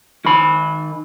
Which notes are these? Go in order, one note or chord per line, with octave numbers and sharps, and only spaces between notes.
D#3 B5